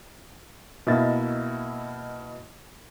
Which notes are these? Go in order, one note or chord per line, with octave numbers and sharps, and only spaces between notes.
B2 A#3 E4 D#5 E5 A6